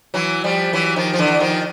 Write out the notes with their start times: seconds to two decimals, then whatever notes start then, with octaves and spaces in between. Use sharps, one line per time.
0.14 E3 F#3
0.44 F3 G3
0.73 E3 F#3
0.96 D#3 F3
1.14 F3
1.18 D3 E3
1.40 D#3 F3